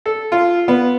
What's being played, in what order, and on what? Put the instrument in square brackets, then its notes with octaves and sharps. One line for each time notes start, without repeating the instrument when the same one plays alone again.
[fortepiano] A4
F4
B3